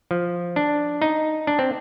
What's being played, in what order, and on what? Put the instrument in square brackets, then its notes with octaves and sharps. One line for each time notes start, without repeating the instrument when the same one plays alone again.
[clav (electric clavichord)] F3
D4
D#4
D4
C4